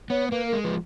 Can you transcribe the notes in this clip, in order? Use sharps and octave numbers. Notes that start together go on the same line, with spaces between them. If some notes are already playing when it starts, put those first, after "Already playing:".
B3 C#5
A#3 B4
G#3 A#4
F3 B4